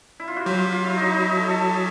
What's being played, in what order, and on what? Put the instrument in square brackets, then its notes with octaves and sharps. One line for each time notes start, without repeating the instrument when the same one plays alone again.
[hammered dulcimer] E4
F4
F#4
[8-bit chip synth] F#3 [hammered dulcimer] G4
[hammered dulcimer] F4
F4
E4
D#4
D#4
E4
A4
A4
G#4